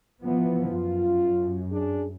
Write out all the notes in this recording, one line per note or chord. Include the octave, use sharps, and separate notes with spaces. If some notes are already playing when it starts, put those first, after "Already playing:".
E3 F3 B3
F#2 F4
D4 G#4